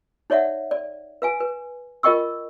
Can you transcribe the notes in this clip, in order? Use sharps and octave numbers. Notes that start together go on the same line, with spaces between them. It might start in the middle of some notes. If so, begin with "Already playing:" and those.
D#4 C#5 D5 E5 F#5
D5
B4 F5 G#5
B4
F4 A#4 D#5 G5 C#6 E6